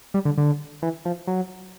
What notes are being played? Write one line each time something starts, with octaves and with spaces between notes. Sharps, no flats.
G3
D3
D3
E3
F3
F#3